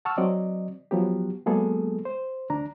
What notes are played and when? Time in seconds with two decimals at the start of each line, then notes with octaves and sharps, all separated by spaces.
0.05 F#5 A5 C#6 E6 F6
0.17 F#3 C4 D5 D#5
0.91 F3 F#3 B3 G4
1.46 F#3 G#3 A#3 B3 G#4 A4
2.05 C5
2.50 D2 D4 A#5